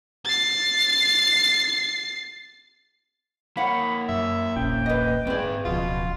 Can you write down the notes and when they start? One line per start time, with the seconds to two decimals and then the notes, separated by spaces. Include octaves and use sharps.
0.25 A6 C7
3.57 A#3 C#5 F5 F#5 B5
4.09 F#2 E5
4.56 E1 A#1 C#4 G5
4.86 B4 D#5
5.27 G#2 C4 G#4 B4 D5
5.65 D1 C#2 B2 F3 F4